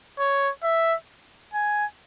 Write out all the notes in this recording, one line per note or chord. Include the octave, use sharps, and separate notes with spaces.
C#5
E5
G#5